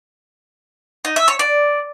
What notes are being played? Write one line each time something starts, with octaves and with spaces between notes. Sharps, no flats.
D#4
E5
C#5
D5